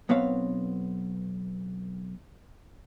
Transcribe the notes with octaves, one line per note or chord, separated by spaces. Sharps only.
B1 B3 C4 C#5 F5